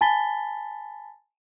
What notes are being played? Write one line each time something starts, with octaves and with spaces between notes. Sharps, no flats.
G#5 A5 B5 A6 B6 G7